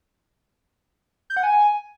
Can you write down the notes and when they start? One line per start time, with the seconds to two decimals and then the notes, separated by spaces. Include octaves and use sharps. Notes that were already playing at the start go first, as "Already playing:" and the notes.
1.30 G6
1.37 F#5
1.43 G#5